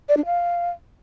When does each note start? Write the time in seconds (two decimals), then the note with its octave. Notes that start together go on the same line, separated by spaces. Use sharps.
0.09 D5
0.17 D4
0.26 F5